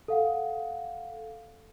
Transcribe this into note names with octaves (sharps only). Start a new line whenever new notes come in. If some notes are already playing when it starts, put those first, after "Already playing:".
A4 F5 F#5